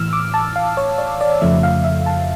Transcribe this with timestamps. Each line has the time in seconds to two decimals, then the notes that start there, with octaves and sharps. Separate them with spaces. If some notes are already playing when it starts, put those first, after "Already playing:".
Already playing: A2 E3 E6 F6
0.13 D6
0.34 A5
0.56 F5
0.77 C#5
0.98 D5
1.21 D5
1.41 F2 C#3 F3 A3 E5
1.63 F5
1.84 E5
2.06 A5